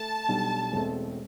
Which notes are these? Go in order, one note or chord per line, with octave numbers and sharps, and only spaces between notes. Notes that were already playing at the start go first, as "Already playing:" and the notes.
Already playing: A3 A5
B1 B2 G3 D4
E1 E2 B2 A3 C4